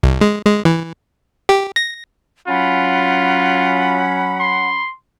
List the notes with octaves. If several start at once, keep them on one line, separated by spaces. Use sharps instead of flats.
C2
G#3
G#3
E3
G4
A#6
F#3 C#4 F4 F#5 B5
C6